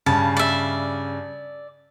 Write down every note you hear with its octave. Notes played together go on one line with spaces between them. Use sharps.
G2 C#3 A5
D5 E5